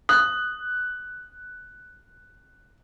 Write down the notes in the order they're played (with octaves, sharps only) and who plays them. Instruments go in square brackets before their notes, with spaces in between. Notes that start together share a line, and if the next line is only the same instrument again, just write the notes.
[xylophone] D#6 [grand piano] F#6